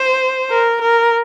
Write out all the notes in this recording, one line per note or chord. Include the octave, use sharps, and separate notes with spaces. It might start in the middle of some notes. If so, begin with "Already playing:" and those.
Already playing: C5
A#4
A#4